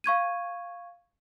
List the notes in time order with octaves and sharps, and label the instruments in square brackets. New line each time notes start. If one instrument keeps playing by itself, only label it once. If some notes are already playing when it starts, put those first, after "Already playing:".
[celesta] F5 C#6 G#6 D#7